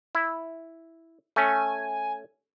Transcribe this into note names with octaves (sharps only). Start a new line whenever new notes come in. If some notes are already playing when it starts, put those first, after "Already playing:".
E4
A3 C#4 G#5